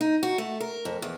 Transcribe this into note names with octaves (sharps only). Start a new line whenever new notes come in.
D#4
F#4
A3
A#4
F2
E2